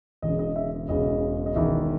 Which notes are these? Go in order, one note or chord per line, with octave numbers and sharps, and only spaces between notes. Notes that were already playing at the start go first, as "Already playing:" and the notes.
E1 E2 C#3 D#5
D#5
E5
E1 E2 C#3 D#5
D#5
E1 E2 D#3 E5